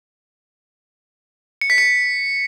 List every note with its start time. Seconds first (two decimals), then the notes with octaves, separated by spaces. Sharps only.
1.61 C#7
1.70 B6
1.78 C#7